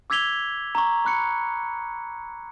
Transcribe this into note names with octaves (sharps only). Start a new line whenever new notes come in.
D6 E6 G#6 B6 F7 G7
A#5 C#6
B5 F#6 C#7